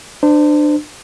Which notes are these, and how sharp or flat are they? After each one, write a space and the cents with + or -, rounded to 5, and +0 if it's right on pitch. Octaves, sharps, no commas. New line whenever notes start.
D4 +25 C5 -25